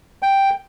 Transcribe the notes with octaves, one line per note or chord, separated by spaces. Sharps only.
G5